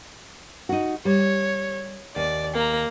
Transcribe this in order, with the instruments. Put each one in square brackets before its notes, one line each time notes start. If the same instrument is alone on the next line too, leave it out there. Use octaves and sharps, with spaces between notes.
[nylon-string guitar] D#4 F#4
[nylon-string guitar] G3 [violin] C#5
[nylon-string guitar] D#2 [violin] D5
[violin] A#3 A#5